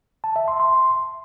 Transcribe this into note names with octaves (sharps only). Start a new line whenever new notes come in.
A5
E5
C6
C6